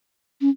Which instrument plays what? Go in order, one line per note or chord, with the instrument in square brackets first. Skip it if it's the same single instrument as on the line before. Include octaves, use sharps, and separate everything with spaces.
[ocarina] C#4